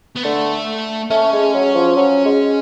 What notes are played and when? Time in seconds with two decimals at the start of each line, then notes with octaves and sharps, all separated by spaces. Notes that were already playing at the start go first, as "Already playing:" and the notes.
0.16 B3
0.24 D3 A3
1.10 A3 C#4
1.33 G#3
1.54 F#3
1.75 F3
1.96 F#3
2.25 G#3